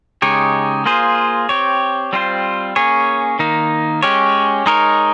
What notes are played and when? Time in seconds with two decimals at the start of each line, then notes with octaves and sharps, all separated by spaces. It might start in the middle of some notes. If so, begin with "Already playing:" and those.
0.22 C#3 G#3 D#4 G4 C#5
0.86 A#3 F4 G#4 C5
1.49 C4 G4 C#5
2.13 G3 C4 F4 C5
2.76 A#3 C#4 G#4 C#5
3.39 D#3 A#3 D#4
4.03 G#3 C#4 G4 C#5
4.66 G#3 D#4 A#4 C#5